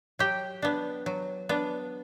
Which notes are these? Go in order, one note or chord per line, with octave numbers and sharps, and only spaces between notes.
F#3 G4 G5
B3 D4
F#3
B3 D4